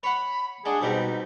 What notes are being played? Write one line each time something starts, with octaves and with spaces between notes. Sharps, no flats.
C#5 F#5 B5
G#3 D4 G#4 F#5
G#2 B2 G3 C4 D#4